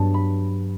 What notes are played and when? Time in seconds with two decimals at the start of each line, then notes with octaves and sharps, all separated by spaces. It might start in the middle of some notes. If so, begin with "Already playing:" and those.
Already playing: G2 F#3 B3 A5
0.14 B5